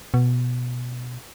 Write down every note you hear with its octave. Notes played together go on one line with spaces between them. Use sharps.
B2